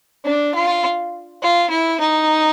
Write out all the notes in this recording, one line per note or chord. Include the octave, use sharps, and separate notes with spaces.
D4
F4
F4
E4
D#4